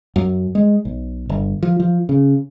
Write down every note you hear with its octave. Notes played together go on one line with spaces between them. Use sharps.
F#2
G#3
B1
G1
F3
F3
C#3